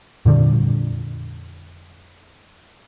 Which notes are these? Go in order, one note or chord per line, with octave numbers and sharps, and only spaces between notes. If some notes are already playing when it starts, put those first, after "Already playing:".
F2 A#2 D3 G3